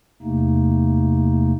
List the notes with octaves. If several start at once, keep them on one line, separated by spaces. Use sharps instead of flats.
E2 C3 A3 A#3 D#4